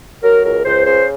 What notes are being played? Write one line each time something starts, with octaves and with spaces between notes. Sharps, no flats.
F#3 A#4
C#2 A#4
C#2 C5
C#3 C5